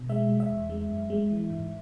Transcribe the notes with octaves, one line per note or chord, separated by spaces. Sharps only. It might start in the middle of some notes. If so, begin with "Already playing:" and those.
Already playing: B2
G#3 E5
G#3
E5
E2
G#3
F#2
G#3
E3
G#2